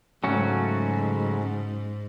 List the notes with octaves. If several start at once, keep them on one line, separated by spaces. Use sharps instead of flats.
G#2 C#3 F#3 A3 C#4 F#4